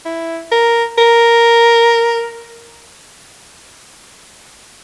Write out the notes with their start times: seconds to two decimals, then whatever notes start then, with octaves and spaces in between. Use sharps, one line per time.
0.06 E4
0.51 A#4
0.98 A#4